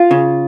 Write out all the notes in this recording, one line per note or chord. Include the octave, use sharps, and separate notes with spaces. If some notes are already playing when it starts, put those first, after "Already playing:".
Already playing: F4
C#3